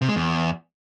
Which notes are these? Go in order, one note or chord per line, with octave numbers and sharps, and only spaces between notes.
C3
G#3
E2